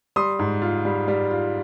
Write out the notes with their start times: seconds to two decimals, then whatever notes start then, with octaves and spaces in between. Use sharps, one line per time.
0.16 G3 C6 D#6
0.39 G#2
0.62 F4
0.85 G3
1.08 G3
1.31 F4